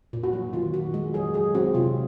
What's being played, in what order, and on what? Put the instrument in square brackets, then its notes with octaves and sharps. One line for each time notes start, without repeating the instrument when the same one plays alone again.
[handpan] A#2
[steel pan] F#4
[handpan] F#3
[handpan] D#3 [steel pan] F4
[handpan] F#4
G#3
[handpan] F#3 [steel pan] G#4
[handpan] F#3 [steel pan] G#4
[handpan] C4 [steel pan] F#4
[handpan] C3 [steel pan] F4